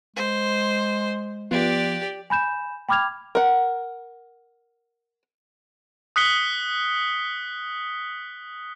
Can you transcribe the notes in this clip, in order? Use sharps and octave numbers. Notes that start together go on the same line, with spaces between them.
G#3 C5
F3 B3 F4 G4 D5
G#5 B5 G6 E7
G5 B5 D6 F6 G#6 F7
A#4 F#5
D#6 F#6 B6 C#7 G7